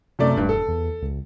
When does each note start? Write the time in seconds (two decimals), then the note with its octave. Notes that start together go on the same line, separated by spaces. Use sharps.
0.19 F#2 C3 A3 D5
0.37 E1 G2
0.49 A4
0.68 E2
1.02 C#2